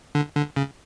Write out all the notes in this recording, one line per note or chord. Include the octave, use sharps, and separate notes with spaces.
D3
D3
C#3